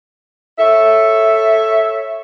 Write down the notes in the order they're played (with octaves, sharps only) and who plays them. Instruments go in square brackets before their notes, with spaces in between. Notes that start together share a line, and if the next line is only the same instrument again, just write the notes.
[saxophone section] A4 C#5 E5